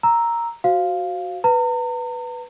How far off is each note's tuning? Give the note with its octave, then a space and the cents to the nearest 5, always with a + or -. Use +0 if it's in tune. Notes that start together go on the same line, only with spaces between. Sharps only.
A#5 +0 E6 +0
F#4 +0 C5 +0 F5 +0
B4 +0 A#5 -40